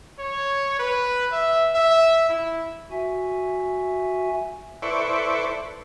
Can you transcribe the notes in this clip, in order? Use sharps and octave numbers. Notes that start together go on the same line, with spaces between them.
C#5
B4
E5
E5
E4
F#4 E5 G#5
E4 A4 B4 C5 D5 C#6